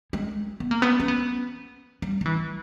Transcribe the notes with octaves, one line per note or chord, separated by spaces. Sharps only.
G#3
B3
A#3
B3
C#4
B3
G3
G3
E3